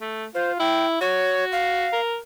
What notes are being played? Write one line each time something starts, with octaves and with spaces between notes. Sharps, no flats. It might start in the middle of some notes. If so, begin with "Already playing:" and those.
A3
F4 C5
E4 G5
F#4 C#5
F5
A#4